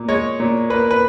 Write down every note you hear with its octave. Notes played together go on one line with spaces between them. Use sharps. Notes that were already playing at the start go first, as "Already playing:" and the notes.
Already playing: A#2
G#3 C#5
A#2
A#3 B4
B4